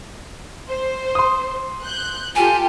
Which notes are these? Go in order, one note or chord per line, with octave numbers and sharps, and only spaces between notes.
C5
C6 D#6
F#6 G6
F4 G4 A4 G#5